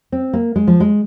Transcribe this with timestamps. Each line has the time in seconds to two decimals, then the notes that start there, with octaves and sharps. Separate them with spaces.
0.12 C4
0.33 A#3
0.56 G#3
0.67 F3
0.80 G#3